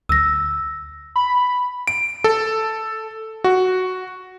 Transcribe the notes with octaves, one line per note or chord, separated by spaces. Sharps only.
D2 E6 A#6
B5
D7
A4
F#4